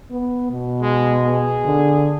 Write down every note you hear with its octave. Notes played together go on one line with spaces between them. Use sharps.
B3
B2
G#3
G#4
D3